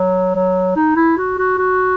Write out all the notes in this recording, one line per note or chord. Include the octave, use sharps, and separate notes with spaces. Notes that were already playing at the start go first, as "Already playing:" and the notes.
Already playing: F#3
F#3
D#4
E4
F#4
F#4
F#4